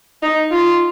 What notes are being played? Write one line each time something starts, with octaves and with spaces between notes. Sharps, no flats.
D#4
F4